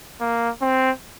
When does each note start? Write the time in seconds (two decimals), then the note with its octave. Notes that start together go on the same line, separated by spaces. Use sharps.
0.21 A#3
0.62 C4